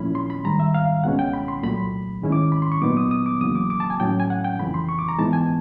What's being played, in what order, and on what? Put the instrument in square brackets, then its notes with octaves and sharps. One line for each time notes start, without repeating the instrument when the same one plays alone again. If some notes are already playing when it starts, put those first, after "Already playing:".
Already playing: [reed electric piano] A#2 F3 A3 C#4 E4 B5
C6
B5
G#2 D#3 G3 A#5
E5
F5
C#2 B2 G#3 C#4 F#5
G5
B5
C6
C2 A#2 F#3 A3 B5
G#2 D#3 G#3 C#4 E4
D6
B5
C6
C#6
A#2 F#3 B3 D#4 D6
D#6
D#6
D6
E2 C#3 F#3 A#3 D#6
D6
D6
A5
G#5
A2 F#3 A3 C#4 G5
G#5
F#5
G5
F2 C#3 E3 B5
C6
C#6
D6
A#5
G#2 E3 G#3 B3 D#4 A5
G#5